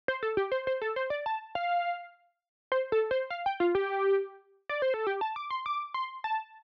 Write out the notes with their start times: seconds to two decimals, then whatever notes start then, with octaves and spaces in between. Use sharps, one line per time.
0.08 C5
0.23 A4
0.37 G4
0.52 C5
0.67 C5
0.82 A4
0.96 C5
1.10 D5
1.26 A5
1.55 F5
2.72 C5
2.92 A4
3.11 C5
3.30 F5
3.46 G5
3.60 F4
3.75 G4
4.69 D5
4.82 C5
4.94 A4
5.07 G4
5.21 A5
5.36 D6
5.50 C6
5.66 D6
5.94 C6
6.24 A5